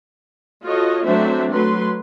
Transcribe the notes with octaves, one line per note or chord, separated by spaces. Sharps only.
F4 F#4 A4 C#5 D#5
F#3 A3 C4 D4 C5 E5
F#3 A3 B4 C6